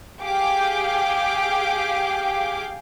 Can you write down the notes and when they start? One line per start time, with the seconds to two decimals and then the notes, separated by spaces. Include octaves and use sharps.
0.22 G4 G#4 F5 D6 G6